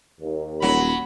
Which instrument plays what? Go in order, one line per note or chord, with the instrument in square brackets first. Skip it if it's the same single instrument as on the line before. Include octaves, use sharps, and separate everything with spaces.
[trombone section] D#2
[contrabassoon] D#1 [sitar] F#3 [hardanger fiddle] B5